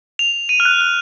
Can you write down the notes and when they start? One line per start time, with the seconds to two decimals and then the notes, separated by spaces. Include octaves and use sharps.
0.19 F7
0.49 D#7
0.60 F6
0.65 F#6
0.81 F#6